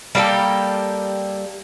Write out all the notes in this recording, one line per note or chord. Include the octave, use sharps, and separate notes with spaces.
G3 A#3 G4 A4